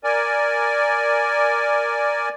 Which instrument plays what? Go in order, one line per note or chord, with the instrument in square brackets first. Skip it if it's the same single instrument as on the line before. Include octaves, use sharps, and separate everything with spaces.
[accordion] A#4 D5 G#5